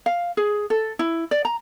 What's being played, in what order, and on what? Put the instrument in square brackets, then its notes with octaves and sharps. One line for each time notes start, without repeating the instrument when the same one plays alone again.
[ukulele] F5
G#4
A4
E4
D5
A#5